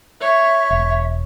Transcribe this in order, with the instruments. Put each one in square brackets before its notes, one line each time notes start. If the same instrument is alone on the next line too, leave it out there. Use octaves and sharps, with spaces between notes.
[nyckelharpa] C#5 [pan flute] E5
[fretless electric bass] E1